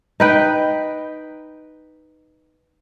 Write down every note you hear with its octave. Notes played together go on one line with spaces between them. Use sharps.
D#4 B4 G5